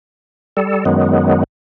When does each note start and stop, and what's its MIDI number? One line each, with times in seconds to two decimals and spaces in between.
0.57 0.84 55
0.57 0.84 69
0.85 1.44 42
0.85 1.44 51
0.85 1.44 54
0.85 1.44 56
0.85 1.44 59